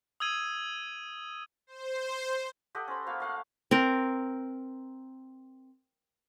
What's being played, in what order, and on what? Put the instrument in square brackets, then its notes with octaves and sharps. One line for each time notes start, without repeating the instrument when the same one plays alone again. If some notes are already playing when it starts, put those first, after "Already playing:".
[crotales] D#6 E6 G#6 D#7
[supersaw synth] C5
[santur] G4 A4 D#5 F#5
C#4 C5 B5
A#3 F#4 F5 B5
A3 F5 F#5
[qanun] C4 A#4